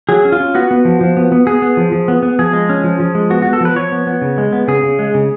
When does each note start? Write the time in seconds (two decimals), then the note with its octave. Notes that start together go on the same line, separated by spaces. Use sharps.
0.09 F#3 G#4
0.25 C#4
0.32 F4
0.40 C#4
0.55 B3 F#4
0.71 B3
0.85 F3
1.01 F3
1.17 B3
1.32 B3
1.47 B3 G#4
1.62 B3
1.77 F3
1.92 F3
2.08 B3
2.23 B3
2.39 F3 G#4
2.53 G#3
2.69 C#4
2.84 F3
3.00 F3
3.15 G#3
3.30 B3 F#4
3.42 B3 F#4
3.53 A4
3.61 F3 B4
3.76 F3 C#5
3.92 B3
4.07 B3
4.22 C#3
4.38 G#3
4.53 B3
4.68 C#3 G#4
4.83 C#3
4.99 G#3
5.14 C#3